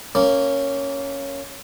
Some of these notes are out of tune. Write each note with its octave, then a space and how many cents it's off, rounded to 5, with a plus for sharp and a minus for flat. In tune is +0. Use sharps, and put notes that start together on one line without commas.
A#3 -10 C#4 +0